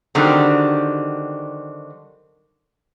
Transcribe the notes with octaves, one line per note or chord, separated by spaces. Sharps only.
D3 D#3 F#3 G3 C4